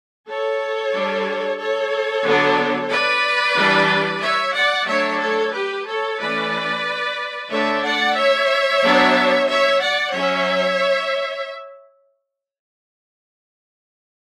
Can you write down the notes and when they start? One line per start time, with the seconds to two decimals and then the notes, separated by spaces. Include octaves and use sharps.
0.27 A4 C#5
0.93 G3 D4
1.58 A4 C#5
2.24 D3 F#3 B3 D4
2.91 B4 D5
3.56 E3 G3 D4
4.21 C#5 E5
4.55 D5 F#5
4.87 F#3 A3 D4 C#5 E5
5.20 A4 C#5
5.53 G4 B4
5.87 A4 C#5
6.19 E3 A3 C#4 B4 D5
7.51 D3 A3 D4 C#5 E5
7.84 D5 F#5
8.16 C#5 E5
8.83 F#3 B3 D4
9.49 C#5 E5
9.81 D5 F#5
10.14 F#3 C#4 C#5 E5